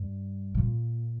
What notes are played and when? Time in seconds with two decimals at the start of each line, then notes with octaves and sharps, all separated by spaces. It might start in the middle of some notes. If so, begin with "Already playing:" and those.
Already playing: G2
0.55 A#2